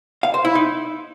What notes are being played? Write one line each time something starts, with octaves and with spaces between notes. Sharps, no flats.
F5
C5
E4
D#4